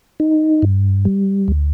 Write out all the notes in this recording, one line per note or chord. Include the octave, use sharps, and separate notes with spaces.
D#4
G2
G3
D2